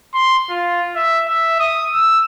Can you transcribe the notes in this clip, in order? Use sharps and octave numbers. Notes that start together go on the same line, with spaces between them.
C6
F4
E5
E5
D#6
E6